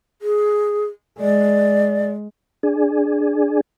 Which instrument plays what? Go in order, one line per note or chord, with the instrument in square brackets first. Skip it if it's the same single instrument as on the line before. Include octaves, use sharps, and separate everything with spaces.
[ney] G#4
[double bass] G#3 [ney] D5
[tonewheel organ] D4 G#4